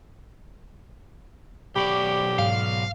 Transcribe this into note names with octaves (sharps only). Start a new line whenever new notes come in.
B1 G4 D5 B5 C#6
G#2 F5